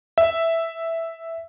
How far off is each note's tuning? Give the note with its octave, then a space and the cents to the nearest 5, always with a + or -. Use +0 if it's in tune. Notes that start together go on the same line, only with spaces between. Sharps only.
E5 +0